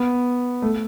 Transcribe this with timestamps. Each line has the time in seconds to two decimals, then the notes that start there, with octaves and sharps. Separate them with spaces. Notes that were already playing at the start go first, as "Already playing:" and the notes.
Already playing: B3
0.62 A3